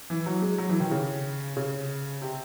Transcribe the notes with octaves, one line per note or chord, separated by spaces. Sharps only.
E3
F#3
G#3
F#3
E3
D#3
C#3
C#3
C3